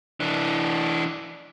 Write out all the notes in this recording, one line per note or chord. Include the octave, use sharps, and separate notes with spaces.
E3 D4